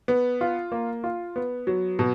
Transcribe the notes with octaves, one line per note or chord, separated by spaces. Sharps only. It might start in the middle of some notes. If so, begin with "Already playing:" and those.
B3
F4
A#3
F4
B3
F#3
B2